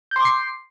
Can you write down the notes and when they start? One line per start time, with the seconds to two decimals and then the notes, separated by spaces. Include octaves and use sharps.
0.11 G6
0.16 C6
0.21 D6
0.25 C7